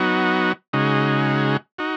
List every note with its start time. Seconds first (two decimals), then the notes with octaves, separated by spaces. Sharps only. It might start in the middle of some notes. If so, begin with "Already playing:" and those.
Already playing: F#3 B3 D#4 F#4
0.73 C#3 G#3 D#4 F#4
1.78 D#4 F#4